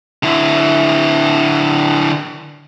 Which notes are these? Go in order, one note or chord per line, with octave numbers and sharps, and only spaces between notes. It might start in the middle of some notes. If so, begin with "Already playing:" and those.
D3 E4